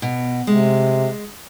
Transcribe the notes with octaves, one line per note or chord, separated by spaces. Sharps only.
B2
C3 G#3